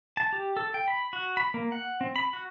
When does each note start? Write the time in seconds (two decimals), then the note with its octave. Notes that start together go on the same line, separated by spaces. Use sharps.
0.17 A5
0.33 G4
0.57 A4
0.74 G5
0.88 B5
1.13 F#4
1.37 B5
1.54 A#3
1.72 F#5
2.01 C4
2.16 B5
2.33 F#4